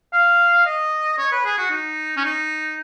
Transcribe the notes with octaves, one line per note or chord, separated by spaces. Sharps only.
F5
D#5
C#5
B4
G#4
F#4
D#4
C#4
D#4